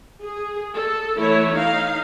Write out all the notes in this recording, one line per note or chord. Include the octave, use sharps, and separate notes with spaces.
G#4
A4
E3 A3 E4 C#5
D#4 F5